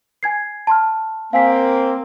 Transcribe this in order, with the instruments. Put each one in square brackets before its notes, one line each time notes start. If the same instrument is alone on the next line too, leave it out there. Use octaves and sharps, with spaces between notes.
[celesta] G#5 G#6 C7
A5 C6 F6
[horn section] A#3 C4 [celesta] F5 G#5 B6